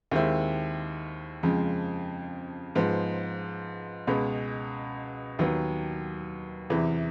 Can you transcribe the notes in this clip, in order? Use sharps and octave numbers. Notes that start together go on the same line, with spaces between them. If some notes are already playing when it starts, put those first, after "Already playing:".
D#2 D#3 G#3 C4 E4
F2 C#3 F3 G#3
G#2 F3 G#3 B3
C#2 B2 G#3 B3
D#2 D#3 F#3 B3
E2 C3 E3